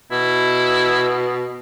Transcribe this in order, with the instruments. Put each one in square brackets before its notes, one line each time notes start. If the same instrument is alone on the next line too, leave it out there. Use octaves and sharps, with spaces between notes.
[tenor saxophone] B2 [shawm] E4